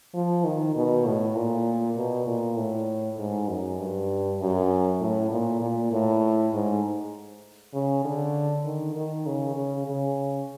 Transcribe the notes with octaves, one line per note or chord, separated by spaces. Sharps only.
F3
D#3
B2
A2
A#2
B2
A#2
A2
G#2
F#2
G2
F#2
A2
A#2
A#2
A2
G#2
C#3
D3
D#3
D#3
C#3
C#3
C#3